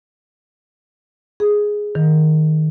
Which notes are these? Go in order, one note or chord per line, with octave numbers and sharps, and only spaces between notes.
G#4
D#3